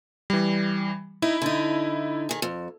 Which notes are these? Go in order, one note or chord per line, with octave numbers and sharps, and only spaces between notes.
E3 G3
D#4 E4
D3 D#4
D#3 G#4
F2